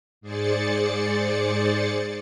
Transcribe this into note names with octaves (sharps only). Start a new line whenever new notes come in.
G#2 G#4 C5 D5 A6 C#7